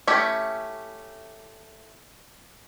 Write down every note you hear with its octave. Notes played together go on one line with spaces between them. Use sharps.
A3 C#4 E4 G4